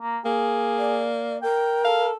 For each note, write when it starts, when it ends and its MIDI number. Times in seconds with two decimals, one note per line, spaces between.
0.01 0.18 58
0.25 1.42 58
0.25 1.05 68
0.78 1.38 74
1.42 2.11 70
1.42 1.80 79
1.84 2.14 69
1.84 2.07 77